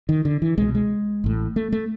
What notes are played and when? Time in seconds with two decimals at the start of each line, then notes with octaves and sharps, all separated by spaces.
0.09 D#3
0.25 D3
0.42 E3
0.58 C2 B2 G#3
0.75 G#3
1.24 A1 A2
1.56 A3
1.72 A3